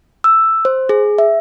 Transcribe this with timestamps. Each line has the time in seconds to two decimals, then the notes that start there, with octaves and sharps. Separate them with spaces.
0.24 E6
0.65 C5
0.89 G#4
1.18 E5